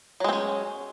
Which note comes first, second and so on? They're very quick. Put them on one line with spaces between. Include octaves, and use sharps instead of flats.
F#3 G#3 C4 C#4